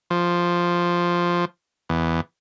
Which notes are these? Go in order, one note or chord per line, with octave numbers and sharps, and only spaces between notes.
F3
E2